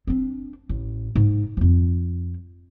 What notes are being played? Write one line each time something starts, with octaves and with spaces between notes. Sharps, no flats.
C4 D4
A1
G#2
F2 F3